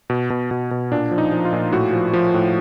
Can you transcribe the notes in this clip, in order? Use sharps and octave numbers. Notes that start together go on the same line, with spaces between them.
B2
B2
B2
B2
A#2 D4
F3
D#4
F3
F4
A#2
A2 F#4
F3
F3
A2